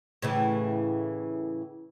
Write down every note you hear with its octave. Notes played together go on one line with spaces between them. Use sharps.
A2 C#3 E3